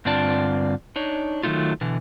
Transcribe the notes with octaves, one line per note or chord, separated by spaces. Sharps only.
G2 D3 C4 F4 D5 A5
D4 D#4 C#5
D#3 F#3 A3 D#4 F4
B2 D3 E3